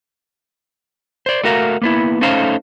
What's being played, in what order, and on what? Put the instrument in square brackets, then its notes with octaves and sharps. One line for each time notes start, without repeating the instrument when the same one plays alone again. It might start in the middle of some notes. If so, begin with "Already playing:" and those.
[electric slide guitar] C5 D5
A3 F#4 A#4 F5
A#3 B3 E4
A3 C#4 D#4 A4 C5 F5